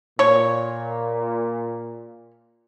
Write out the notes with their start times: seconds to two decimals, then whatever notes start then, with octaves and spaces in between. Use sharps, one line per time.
0.19 A#2 C#5